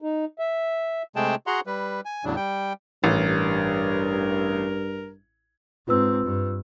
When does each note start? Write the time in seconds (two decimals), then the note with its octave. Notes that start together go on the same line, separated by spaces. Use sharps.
0.02 D#4
0.39 E5
1.16 C3 G#3 A3 G#4 G5 A5
1.47 F#4 G#4 F#5 A#5 C6
1.67 G3 B4
2.05 G#5
2.25 E2 A2 C#3 F#3 D4
2.36 G3 G5
3.04 A1 G2 A#4
5.88 G#2 C4 F4 B4 E6
6.25 G2